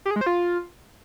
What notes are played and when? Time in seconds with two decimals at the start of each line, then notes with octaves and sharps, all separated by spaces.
0.05 G4
0.11 G#4
0.16 G#3
0.21 C5
0.26 F4